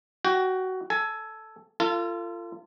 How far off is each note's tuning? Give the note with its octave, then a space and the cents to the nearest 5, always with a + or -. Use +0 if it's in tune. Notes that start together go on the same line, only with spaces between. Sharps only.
F#4 +15 G5 +0
A4 +0 G#5 +15
F4 -25 A4 +35